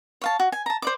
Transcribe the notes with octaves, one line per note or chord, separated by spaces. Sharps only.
C#5 F5 A5
F#4
G#5
A5 A#5
C5 D5 D6